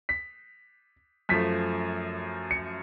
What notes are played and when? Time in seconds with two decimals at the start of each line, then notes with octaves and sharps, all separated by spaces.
0.09 B6
1.29 F#2 F3 A3 B6
2.51 C#7